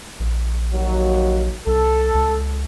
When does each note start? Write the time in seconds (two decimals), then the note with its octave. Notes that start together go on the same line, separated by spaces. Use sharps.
0.20 A#1
0.73 D#2 F#3
1.67 C2 A4
2.15 C#2